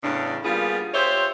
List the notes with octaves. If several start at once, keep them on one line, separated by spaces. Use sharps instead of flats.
E2 A2 C#3 D4
G3 A#3 B3 F4 G#4
F4 G4 C5 C#5 E5